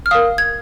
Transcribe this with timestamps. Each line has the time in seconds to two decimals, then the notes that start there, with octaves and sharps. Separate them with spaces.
0.06 F6
0.11 A#4 F5 D#6
0.38 G#6